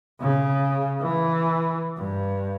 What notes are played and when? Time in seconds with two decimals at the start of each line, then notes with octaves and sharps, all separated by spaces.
0.20 C#3
1.01 E3
1.97 G2